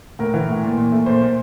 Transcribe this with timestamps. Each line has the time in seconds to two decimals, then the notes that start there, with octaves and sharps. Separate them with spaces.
0.19 A2 A#4
0.34 E3
0.49 A2
0.63 A#2
0.78 A#2
0.92 A3
1.06 A#2 C5
1.21 A#2